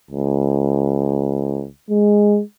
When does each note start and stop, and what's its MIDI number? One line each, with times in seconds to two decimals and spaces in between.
0.11 1.66 37
1.90 2.41 56